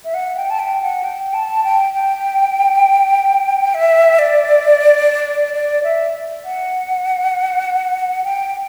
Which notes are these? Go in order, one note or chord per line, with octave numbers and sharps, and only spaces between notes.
E5
F#5
G5
A5
G5
F#5
G5
A5
G5
G5
E5
D5
D5
E5
F#5
G5